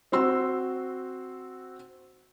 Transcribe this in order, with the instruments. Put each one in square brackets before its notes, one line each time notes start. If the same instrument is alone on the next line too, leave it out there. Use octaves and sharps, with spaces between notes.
[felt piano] C4 F#4 C6 E6